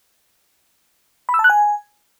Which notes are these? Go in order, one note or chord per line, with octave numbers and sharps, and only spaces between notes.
B5
E6
A5
F#6
G#5